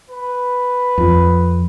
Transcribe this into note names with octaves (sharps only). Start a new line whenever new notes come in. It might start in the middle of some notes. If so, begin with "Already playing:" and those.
B4
F2